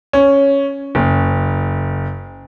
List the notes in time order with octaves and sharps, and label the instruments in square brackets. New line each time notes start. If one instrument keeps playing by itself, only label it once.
[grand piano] C#4
F#1